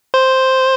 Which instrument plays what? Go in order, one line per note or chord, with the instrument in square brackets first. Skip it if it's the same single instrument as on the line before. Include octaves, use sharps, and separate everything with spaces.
[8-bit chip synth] C5